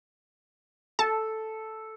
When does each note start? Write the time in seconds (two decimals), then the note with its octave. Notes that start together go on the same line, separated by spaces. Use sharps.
0.99 A4 A5